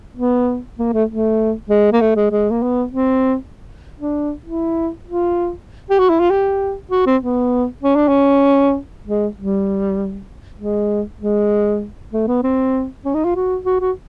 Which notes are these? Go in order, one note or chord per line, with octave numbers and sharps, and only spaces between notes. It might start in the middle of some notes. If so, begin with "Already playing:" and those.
B3
A#3
A3
A3
G#3
A#3
A3
G#3
G#3
A#3
B3
C4
D4
E4
F4
G4
F#4
E4
F4
G4
F#4
C4
B3
C#4
D4
C#4
G#3
G3
G#3
G#3
A3
B3
C4
C#4
D#4
F4
F#4
F#4
F#4